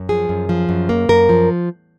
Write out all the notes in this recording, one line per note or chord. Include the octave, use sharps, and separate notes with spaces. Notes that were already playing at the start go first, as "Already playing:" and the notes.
Already playing: F#2
F3 G#4
F#2
F3
F#2
A#3
F#2 A#4
F3